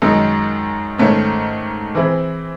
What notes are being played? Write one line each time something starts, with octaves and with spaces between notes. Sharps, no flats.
F#2 D#3 G#3 D#4
G#2 D#3 A3 C#4
E3 C4 E4 G#4